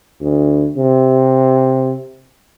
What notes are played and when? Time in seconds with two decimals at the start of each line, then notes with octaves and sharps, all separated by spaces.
0.21 D2
0.77 C3